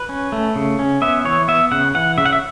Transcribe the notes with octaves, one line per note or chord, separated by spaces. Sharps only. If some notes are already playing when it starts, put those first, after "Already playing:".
Already playing: B4
C#4
A3
C#3
C#4
B3 E5
E3 C#5
B3 E5
C#3 F#5
E3 F#5
C#3 E5
F#5
E5